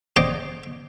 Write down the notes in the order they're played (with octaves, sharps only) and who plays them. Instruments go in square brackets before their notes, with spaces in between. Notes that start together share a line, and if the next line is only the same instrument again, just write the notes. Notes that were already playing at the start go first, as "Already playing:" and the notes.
[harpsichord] C5 D5 D#5 G5 C6 D6